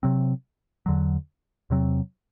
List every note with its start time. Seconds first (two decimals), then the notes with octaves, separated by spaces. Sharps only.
0.03 C3 F#3 C4
0.86 E2 D3 F#3
1.70 E2 C3 F#3 C4